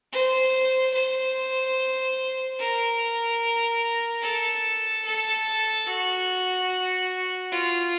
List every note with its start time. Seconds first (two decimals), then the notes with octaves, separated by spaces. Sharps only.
0.12 C5
0.94 C5
2.59 A#4
4.23 A4
5.05 A4
5.87 F#4
7.52 F4